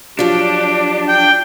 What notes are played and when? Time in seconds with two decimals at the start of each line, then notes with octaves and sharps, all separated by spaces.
0.19 F3 F#3 D4 G4
1.08 G5